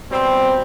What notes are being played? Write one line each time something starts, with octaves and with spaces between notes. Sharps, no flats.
B2 G3 C4